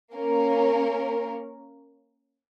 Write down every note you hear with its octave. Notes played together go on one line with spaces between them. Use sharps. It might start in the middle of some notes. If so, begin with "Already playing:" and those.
A#3 C#4 A#4